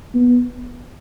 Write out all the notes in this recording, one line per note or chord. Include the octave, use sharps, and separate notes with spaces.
B3